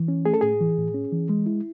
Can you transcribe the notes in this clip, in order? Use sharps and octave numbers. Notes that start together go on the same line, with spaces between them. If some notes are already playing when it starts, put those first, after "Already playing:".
Already playing: E3
C#4
A3 G#4
A4
A2 G#4
E3
A2
C#4
E3
G#3
E4